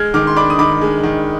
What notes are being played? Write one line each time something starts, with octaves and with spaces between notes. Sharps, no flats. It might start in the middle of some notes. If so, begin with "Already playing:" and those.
Already playing: G#3 F6 G#6
D#3 D6 F6
C6
D4 B5 D6
D#6
D#3 B5 D6
G#3
D#3